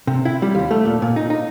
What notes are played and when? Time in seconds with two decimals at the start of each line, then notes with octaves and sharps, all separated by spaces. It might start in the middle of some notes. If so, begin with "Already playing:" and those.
0.07 C3
0.25 E4
0.42 G3
0.55 D#2
0.71 A3
0.85 A#2
1.02 A#2
1.16 D#4
1.30 D#4